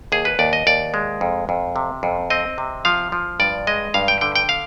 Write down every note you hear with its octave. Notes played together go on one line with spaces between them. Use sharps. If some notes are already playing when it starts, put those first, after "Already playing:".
D#2 G#4
B4
D#2 D5
D#5
D#2 D5
G#3
F2
F2
C3
F2
C4 D#5
C3
F3 F5
F3
G2 D5
G#3 D#5
G2 F5
G5
D3 G5
G5
F5